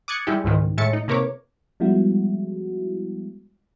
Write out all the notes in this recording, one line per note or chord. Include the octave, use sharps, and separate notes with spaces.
D6 D#6 F#6 G#6 A6 C#7
G3 G#3 E4 G4
C#2 G#2 D#3 G#3
A2 G#3 E5 A6 C#7
D#4
C3 A#3 A#4 B4 C#5 D6
F3 G3 G#3 B3 E4 F#4